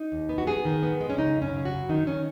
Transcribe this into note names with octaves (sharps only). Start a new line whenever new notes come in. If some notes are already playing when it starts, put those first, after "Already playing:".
Already playing: D#4
D#2
B3
F#4
B3 G#4
D#3
B3
G#3
C#4
C#3 D#4
F#2
C#4
C#3
F#4
F#2
D#3 D#4
D#3 C#4